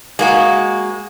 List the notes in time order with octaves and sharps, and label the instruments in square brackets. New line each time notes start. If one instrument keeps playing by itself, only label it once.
[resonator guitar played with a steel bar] G#3 A#3 F#4